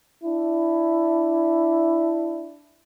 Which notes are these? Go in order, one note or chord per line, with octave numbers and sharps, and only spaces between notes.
D4 E4